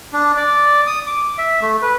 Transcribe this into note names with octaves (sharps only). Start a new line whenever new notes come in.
D4
D5
D#6
D6
E5
A3
B4